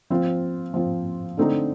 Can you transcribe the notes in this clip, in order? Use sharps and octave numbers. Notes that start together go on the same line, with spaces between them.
F3 C4 F4
F3 C4 F4
D3 A3 C4 D#4